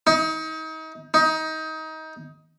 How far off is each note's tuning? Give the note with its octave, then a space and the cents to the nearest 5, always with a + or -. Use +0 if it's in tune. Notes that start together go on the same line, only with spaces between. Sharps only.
D#4 +35
D#4 +25